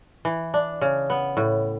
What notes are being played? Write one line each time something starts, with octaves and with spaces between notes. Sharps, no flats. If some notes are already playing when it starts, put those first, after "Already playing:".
E3
D4
C#3
B3
A2